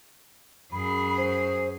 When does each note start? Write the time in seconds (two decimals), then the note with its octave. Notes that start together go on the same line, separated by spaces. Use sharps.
0.72 F#2 G#4 B5
1.17 C5